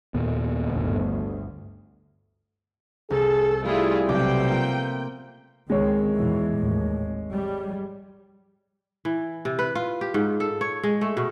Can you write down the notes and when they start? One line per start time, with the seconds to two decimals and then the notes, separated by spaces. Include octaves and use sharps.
0.14 D#2 A#2 B3
0.65 G1 D2
3.10 C2 G#4 A4 E7
3.65 G3 A3 E4 F4 G#4 A4
4.09 B1 C3 G5 D6
4.47 A#3 F4
5.70 C#2 D#3 G#3 C4 C#5
6.15 E2 B2 E3
6.56 G#1 D#2 A2
7.32 G3
9.05 E3
9.45 C3
9.59 B4
9.75 F4
10.01 G4
10.14 G#2
10.40 A4
10.61 C#5
10.83 G#3
11.01 A3
11.17 B2